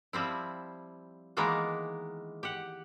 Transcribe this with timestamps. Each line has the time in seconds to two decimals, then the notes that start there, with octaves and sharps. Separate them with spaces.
0.13 F3 G3 C4 E4
1.37 D#3 E3 G#3 A#3 B3 A#4
2.43 G4 F#5